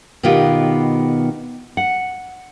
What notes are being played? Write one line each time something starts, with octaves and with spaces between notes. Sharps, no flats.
B2 D#3 B3 F4 G4
F#5